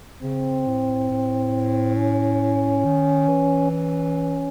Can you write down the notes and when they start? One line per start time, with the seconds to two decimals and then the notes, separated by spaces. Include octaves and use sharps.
0.23 C#3 C4
0.66 A2
1.10 A2
1.97 C#4
2.85 D#3
3.28 E3
3.71 C#4